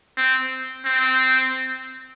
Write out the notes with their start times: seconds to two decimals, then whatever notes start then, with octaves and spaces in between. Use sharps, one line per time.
0.17 C4
0.85 C4